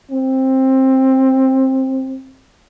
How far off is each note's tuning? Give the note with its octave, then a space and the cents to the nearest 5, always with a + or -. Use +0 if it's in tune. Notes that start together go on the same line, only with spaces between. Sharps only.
C4 +15